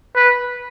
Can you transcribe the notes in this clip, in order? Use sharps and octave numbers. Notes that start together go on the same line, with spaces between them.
B4